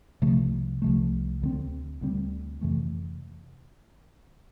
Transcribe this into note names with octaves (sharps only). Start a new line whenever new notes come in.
C2 C3 F3 A3
C2 C3 F3 A3
D2 D3 G3 C4
D2 D3 G3 C4
F2 C3 E3 A3